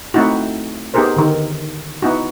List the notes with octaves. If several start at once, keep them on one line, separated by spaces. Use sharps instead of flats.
A3 C4 D#4 E4 F#4
B3 D#4 G4 G#4 A#4 C5
D3 D#3 A#4
B3 D#4 E4 F#4